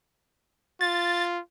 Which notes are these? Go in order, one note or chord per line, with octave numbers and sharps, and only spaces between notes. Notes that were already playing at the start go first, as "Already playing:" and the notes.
F4 A6